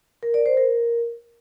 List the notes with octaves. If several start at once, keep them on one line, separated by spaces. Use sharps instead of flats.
A#4
D5
C5
A#4